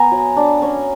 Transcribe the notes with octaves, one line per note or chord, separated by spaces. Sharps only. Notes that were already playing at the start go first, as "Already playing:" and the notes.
Already playing: B3 G#5 A#5
F#3
D4
C#4